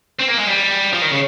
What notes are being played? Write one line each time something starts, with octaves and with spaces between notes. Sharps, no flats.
C4
A#3
G#3
G3
F3
D#3
C#3